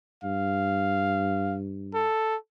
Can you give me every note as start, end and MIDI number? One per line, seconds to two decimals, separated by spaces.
0.23 2.06 43
0.23 1.57 77
1.94 2.36 69